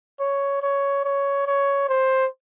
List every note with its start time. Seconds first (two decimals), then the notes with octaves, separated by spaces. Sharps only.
0.20 C#5
0.62 C#5
1.04 C#5
1.47 C#5
1.88 C5